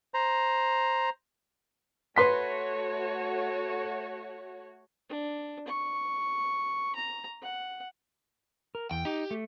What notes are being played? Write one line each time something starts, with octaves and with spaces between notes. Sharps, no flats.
C5 A#5
A3 F#4 B4 C#5 C6 B6
D4
C#6
A#5
F#5
A#4
E2 G5
D#4 G4
A3